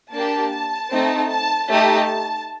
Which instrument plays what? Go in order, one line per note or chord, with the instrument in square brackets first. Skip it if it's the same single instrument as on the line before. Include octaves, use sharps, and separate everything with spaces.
[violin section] A#3 D4 G4 A5
A5
A3 C4 D#4
A5
A3 D#4 G4 A5